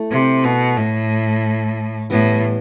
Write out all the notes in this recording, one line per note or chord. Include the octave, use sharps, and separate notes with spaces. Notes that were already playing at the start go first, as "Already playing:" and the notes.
Already playing: A3 E4 A4
C3
B2
A2
A2 E3 G3 B3